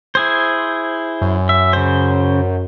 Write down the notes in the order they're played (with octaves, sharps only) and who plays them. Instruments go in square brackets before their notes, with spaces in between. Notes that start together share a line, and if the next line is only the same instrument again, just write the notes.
[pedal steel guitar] E4 G#4 C5
[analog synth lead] F#2
[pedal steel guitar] E5
C#3 C5